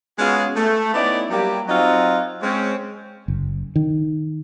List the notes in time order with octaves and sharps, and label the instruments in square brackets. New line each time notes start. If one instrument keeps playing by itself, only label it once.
[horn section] G#3 B3 C#4 F4 F#4 G#4
A3
B3 C#4 D#4 E4 D5
F#3 G3 A#3 G4
F#3 C4 D#4 F4 F#4
G#3 C4 C#4
[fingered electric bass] F#1
D#3